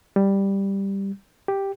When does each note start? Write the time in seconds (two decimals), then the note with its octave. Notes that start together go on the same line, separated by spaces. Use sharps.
0.16 G3
1.48 G4